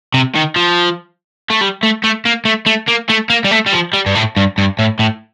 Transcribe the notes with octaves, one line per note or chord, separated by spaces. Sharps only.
C3
D#3
F3
A3
G3
A3
A3
A#3
A3
A3
A#3
A3
A#3
G3
A3
G3
F3
G3
G2
A2
G2
G2
A2
A2